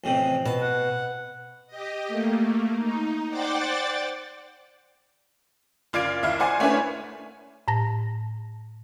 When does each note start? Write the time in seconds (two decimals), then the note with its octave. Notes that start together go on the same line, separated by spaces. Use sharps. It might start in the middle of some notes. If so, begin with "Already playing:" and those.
0.04 A1 F2 C3
0.46 B2 A5
0.62 F#5
1.67 G4 D#5
2.07 A3 A#3
2.77 D#4
3.29 C5 D5 F#5 G5 D6 A6
5.93 F#1 F4 D5 G#6 D7
6.23 D#2 E4 F5
6.40 C5 D5 F#5 G#5
6.60 A3 C#4 D4 E4 B4 G#5
7.68 A2 A5 A#6